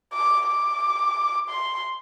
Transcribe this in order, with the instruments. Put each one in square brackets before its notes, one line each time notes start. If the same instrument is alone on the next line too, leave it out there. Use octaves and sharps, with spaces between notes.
[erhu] D6
D6
C6